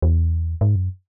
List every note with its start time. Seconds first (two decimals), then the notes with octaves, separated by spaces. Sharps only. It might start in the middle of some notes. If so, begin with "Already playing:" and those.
0.02 E2
0.61 G#2
0.76 F#2